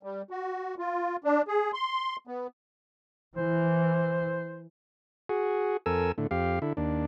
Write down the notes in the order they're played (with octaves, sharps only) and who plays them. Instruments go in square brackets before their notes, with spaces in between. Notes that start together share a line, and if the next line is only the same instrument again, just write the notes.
[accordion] G3
F#4
F4
D4
G#4
C6
B3
[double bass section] E3 [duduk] C5
[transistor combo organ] F#4 G#4
F2 A4 A#4 G#5 E6
A2 D3
F2 G4 F5
D3 E4
D#2 D4